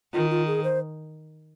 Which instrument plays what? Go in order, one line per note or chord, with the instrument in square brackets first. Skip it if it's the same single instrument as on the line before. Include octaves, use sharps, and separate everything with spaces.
[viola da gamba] D#3 [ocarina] F4
[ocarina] F4
G#4
C5